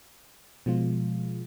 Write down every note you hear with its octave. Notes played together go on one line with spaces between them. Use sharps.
B2 F3 G#3 F4